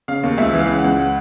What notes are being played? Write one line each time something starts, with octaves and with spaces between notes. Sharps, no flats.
C#3 F5
D#2
C#2 E5
E3
F5
C#3
F#5
C#2
F#5